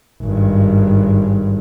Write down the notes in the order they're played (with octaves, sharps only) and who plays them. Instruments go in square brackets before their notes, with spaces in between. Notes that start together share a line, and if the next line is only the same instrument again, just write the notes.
[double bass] G#1 G2